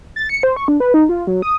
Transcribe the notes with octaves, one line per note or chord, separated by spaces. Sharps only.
A6
C#7
C5
C#6
D4
B4
D#4
F4
F#3
D#6